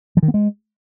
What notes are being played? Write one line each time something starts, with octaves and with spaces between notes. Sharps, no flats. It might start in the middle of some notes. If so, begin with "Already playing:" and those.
F3
D#3
B3
G#3